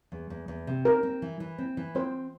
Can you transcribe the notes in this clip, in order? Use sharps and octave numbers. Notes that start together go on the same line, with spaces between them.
E2
E2
E2
C3
C4 A#4
C4
E3
E3
C4
E3
C4 C5